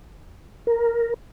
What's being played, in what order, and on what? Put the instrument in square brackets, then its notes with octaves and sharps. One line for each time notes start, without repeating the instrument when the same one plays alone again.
[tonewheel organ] A#4